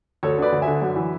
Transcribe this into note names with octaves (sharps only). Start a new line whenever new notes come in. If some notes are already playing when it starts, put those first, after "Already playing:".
D2 A4 C#5
D3 B4 D5
D2
E5 G#5
D3
F#2
E3